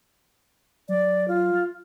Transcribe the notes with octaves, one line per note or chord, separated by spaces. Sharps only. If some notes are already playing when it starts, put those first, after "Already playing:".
F#3 D5
F4